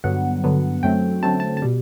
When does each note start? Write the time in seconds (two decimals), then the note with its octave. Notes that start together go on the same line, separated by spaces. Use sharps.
0.04 G2 D3 F#3 B3 F#5
0.44 G2 D3 F#3 B3
0.83 F#2 D3 F#3 A3 C4 G5
1.23 F#2 D3 F#3 A3 C4 A5
1.40 A5
1.57 A5
1.62 B2 G3